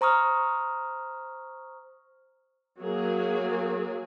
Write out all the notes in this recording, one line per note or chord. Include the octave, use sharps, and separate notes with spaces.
C5 A#5 C#6 D#6 F6
F#3 A#3 G#4